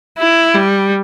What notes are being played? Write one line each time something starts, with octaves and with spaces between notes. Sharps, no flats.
E4
G3